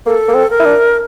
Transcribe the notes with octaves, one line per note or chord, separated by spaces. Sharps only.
A#3 A4
A#3
C4
A#4
E4
D4